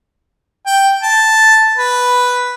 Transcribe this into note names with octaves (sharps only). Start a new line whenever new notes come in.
G5
A5
B4